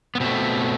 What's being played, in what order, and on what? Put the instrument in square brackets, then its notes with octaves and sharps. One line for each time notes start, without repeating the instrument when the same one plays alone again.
[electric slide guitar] B3
B2 A3 C4